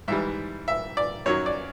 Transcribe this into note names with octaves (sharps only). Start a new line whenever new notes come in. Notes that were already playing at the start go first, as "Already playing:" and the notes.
G#2 E3 G3 E5
E5
D5
F#2 D#3 F#3 C#5
D5